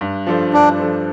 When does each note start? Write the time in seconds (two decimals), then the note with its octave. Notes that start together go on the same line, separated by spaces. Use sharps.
0.01 G2
0.27 F3 D4 A4 C5
0.53 G2 D4
0.79 F3 D4 A4 C5